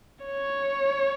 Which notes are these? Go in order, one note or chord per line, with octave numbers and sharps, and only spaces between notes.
C#5